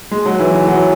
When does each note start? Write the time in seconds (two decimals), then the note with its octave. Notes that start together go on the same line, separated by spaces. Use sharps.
0.11 G#3
0.26 F#3
0.40 E3
0.68 F#3